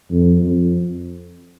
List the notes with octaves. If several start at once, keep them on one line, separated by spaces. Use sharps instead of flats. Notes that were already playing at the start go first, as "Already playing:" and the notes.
F2
F2